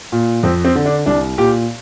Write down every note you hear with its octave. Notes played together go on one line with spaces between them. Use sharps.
A#2
F2 C4
C4
D3
D4
C2 D4
A#2 G4